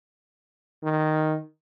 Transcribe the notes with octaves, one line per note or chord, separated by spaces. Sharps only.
D#3